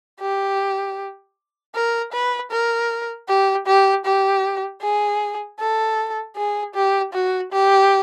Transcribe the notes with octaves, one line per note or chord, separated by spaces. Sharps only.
G4
A#4
B4
A#4
G4
G4
G4
G#4
A4
G#4
G4
F#4
G4